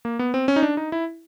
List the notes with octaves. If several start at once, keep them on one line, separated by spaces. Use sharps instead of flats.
A#3
B3
C4
C#4
D#4
D4
D#4
E4